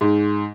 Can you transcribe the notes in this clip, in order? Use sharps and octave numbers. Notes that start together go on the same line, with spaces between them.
G#2